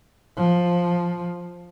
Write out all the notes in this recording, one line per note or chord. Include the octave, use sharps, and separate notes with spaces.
F3